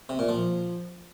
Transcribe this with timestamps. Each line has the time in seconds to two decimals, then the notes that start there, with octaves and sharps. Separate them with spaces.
0.09 C3
0.19 A#2
0.29 F3